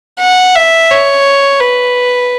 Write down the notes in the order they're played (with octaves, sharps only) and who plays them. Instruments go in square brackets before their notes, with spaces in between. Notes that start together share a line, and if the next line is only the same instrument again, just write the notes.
[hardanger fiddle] F#5
E5
C#5
B4